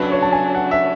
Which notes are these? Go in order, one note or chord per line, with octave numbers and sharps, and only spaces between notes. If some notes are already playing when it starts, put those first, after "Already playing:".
Already playing: C#3 F#3 A3 D4 B4
C#5
A5
G#5
F#5
E5